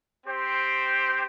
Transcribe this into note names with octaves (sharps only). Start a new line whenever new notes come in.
C4 G4 C5